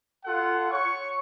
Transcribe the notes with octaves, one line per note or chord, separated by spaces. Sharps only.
F4 A4 F#5
C#5 C#6